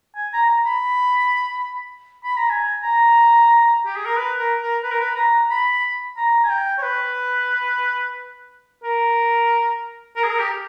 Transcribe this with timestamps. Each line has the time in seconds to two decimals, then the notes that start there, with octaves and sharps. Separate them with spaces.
0.16 G#5
0.33 A#5
0.49 A#5
0.66 B5
2.24 B5
2.37 A#5
2.50 G#5
2.83 A#5
3.86 G4
3.96 G#4
4.06 A#4
4.17 B4
4.38 A#4
4.61 A#4
4.84 B4
4.91 A#4
5.01 B4
5.16 A#5
5.50 B5
6.17 A#5
6.44 G#5
6.50 G5
6.78 C#5
6.83 B4
8.83 A#4
10.16 A#4
10.24 G#4
10.31 A#4
10.40 G4